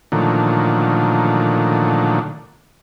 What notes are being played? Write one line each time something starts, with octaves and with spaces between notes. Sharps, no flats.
A#2 D3 D#3 F3 F#3 A3